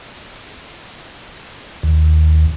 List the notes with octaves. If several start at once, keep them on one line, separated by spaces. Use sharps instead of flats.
D#2